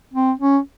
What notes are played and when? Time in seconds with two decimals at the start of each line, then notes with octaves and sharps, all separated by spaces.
0.14 C4
0.39 C#4